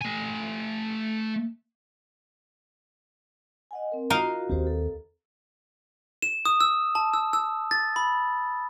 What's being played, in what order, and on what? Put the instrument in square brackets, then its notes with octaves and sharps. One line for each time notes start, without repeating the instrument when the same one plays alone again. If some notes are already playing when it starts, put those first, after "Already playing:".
[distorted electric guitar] A3 G#5
[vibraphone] D#5 F#5 G#5
C4 A#4
[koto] D#4 A#4 F5 [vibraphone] F4 F#4
[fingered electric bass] D#2 C4 [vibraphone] F#4 G4 C5
[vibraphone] A4
[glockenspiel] E7
D#6
E6
A5
E6
E6
A6
B5